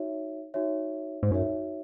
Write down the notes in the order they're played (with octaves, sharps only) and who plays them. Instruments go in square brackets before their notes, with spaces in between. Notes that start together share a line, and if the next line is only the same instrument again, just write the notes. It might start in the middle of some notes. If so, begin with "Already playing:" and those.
Already playing: [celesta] D#4 F#4 C#5 E5
D#4 F#4 C#5 E5
[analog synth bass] G#2
[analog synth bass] F#2 [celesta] D#4 F#4 C#5 E5